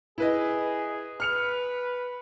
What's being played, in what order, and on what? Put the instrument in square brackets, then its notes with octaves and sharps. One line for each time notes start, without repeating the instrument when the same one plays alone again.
[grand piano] E4 B4 D#5 [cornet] G#4
[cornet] B4 [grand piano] F6 C#7 F7